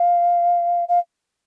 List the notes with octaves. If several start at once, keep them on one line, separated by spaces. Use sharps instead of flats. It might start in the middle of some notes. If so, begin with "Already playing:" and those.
Already playing: F5
F5